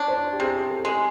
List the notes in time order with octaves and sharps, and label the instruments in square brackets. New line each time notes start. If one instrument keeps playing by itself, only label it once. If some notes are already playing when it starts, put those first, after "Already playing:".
Already playing: [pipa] D4 [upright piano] C#5
[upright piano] C5
G4
[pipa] C3 [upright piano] G#4
[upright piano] A4
[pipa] G#3